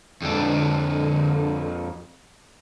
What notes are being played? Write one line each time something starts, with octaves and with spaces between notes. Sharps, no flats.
F2 D3 D4